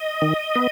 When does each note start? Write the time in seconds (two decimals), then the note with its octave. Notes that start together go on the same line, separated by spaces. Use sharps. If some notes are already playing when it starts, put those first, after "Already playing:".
Already playing: D#5
0.22 D#3
0.55 B3